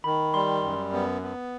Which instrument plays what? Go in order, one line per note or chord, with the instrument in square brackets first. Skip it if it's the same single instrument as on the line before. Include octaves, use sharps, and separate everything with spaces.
[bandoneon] D#3 [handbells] B5
[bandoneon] G3 [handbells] C6
[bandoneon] F#2
B3
B3